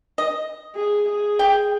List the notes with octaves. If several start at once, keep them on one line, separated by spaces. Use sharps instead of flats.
D#5
G#4
G#4
G5